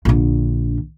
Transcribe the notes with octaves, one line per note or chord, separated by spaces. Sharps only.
A#1 D3